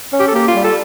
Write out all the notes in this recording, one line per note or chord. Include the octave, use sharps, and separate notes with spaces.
C#4
G4
A4
A#3 G4
F4
G3
A4